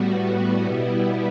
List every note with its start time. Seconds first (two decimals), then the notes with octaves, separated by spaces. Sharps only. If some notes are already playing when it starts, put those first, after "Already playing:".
Already playing: A2 G3 B3 F#4
0.65 B2 G3 B3 E4